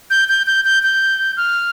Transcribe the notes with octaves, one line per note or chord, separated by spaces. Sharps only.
G6
G6
G6
G6
G6
F6